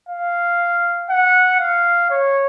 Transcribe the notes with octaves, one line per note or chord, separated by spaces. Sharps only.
F5
F#5
F5
C#5